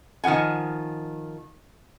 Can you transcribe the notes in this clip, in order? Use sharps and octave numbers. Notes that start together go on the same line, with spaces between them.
D#3 F3 G#4 F#5 G#5